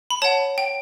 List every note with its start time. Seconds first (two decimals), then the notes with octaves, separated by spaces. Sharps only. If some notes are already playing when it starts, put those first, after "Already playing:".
0.10 B5
0.22 C#5 F#5 A5
0.58 G5